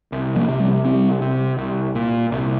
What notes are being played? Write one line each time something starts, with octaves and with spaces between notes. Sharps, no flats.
C2
F3 A#3
C3
G3 C4
C2 G3 C4
C3
C2
A#2
C2